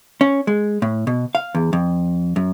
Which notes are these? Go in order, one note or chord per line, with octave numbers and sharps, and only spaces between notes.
C#4
G#3
A2
B2
F5
E2
F2
F#2